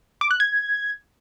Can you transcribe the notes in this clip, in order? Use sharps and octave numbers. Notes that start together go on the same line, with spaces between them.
D6
F#6
G#6